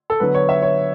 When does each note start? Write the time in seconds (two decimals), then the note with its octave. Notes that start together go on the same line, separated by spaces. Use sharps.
0.10 A4
0.20 D3 F#3 B3 B4
0.34 C#5
0.49 E5
0.62 C#5